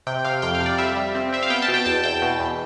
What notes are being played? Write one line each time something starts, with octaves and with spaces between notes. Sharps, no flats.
C3 G5
C3 F5
F2 G5
F5
C3
D5
G3 E5
G3
C4
C4 E5
F5
B3 G5
A5
B2
G5
E2 A5
E2 G5
B2
E2